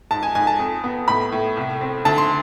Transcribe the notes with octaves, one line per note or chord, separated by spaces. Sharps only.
G#2 A5
G#5
G#2 G#5
A5
F2
B3
A2 B5
A2
C2
C4
D2 A5
C6